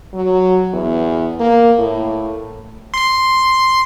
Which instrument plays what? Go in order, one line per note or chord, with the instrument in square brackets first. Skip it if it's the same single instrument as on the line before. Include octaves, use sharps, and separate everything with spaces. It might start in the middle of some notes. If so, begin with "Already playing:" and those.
[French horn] F#3
E2
A#3
A2
[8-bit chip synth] C6 C7